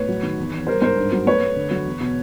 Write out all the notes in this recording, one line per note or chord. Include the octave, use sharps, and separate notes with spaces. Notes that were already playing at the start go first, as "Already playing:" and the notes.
Already playing: A2 B4 C#5
F#3
D#3
E2
E2
G3 A#4 C5
G#2 A#4 C5
G2
F#3
A3 B4 C#5
A3
D3
F#3
E2
B2